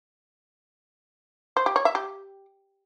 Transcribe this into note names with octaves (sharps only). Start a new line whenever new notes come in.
C5
G4
C#5
E5
G4